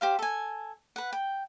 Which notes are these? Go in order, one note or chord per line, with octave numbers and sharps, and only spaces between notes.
G4 C5 F5
A4 G#5
B4 F#5
G5